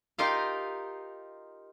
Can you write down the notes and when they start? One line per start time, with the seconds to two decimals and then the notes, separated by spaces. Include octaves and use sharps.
0.18 D#4 F4 G4 A#4 D#5 F5